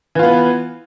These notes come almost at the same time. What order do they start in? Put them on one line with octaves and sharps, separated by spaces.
E3 F4 B3